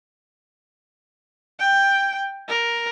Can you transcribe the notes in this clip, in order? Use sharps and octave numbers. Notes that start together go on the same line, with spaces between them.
G5
A#4